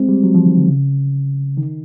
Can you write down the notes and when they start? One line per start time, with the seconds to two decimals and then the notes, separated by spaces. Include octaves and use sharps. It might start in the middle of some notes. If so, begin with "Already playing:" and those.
Already playing: G#3 C4
0.09 G3
0.23 F#3
0.34 F3
0.45 D#3
0.57 D3
0.68 C#3
1.57 D#3